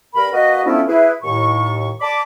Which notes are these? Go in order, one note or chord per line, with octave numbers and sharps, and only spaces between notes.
G2 A#4 B5
A#3 F#4 B4 D#5
F3 A3 B3 C#4 D4 E4
E4 G#4 B4
D#2 A2 C#6
D5 A5 B5 D6